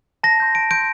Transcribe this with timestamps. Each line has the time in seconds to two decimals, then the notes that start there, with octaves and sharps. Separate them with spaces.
0.23 A5 A#6
0.40 C6 G6
0.55 A5 D7
0.71 C6 G6 D7